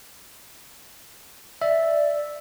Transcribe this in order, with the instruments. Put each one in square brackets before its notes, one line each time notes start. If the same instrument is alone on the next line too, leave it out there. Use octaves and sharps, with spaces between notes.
[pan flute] D5 [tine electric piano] E5